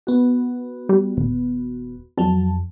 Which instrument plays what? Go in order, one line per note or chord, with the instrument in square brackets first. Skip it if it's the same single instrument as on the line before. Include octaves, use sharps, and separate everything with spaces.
[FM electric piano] B3 F#4
[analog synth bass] G3
D#1
[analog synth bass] F2 [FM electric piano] F#3 A5